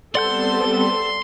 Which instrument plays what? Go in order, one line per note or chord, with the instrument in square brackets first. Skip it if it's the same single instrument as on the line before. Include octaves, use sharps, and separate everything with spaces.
[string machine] G3 B3 C4 [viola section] A4 [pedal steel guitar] D5 F#5 G6 [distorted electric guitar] C6